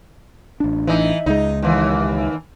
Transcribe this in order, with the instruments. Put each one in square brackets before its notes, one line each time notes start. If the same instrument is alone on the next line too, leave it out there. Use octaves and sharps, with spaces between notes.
[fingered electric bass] A1 D4
[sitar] E3 D#4
[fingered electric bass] C#2 G#3 [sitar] D#4
[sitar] D#2 E3